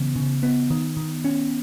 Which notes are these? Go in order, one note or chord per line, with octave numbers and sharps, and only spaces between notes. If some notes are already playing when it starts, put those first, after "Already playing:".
Already playing: C#3 E3 B3
C#3
B3
D#3
D#3
C#4